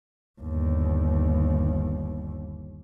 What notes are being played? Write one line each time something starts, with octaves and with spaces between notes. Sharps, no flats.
G1 D#2